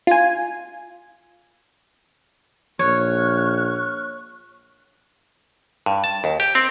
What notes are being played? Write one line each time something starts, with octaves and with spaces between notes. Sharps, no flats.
F4 G#5
A#1 C#5 C#6 F6 F#6
G2
A5
D#2
G4
C4